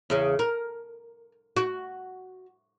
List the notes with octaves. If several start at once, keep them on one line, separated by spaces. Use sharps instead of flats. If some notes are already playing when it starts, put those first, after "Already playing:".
E2 C#3
A#4
F#4